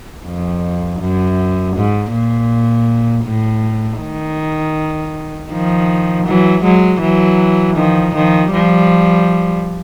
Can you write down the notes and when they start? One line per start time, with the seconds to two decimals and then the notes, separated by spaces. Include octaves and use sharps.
0.26 F2
1.01 F#2
1.76 G#2
2.13 A#2
3.26 A2
4.01 D#3
5.51 D#3 F3
6.27 E3 F#3
6.64 F#3 G#3
7.02 E3 F#3
7.77 D#3 F3
8.15 D#3 F3
8.52 F3 G3